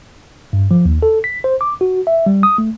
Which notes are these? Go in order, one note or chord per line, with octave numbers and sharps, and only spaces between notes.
G2
F3
D#2
A4
B6
C5
D6
F#4
E5
G3
D#6
A3